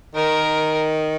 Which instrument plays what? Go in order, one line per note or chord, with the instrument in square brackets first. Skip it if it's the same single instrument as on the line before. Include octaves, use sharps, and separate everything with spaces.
[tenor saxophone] D#3 [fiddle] A#4